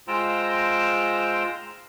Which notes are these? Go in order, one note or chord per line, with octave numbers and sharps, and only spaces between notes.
G#3 F4 C5 G5 A#5 E6